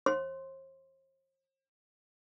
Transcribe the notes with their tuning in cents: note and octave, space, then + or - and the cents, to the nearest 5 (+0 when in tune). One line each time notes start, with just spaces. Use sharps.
C5 +45 C6 +0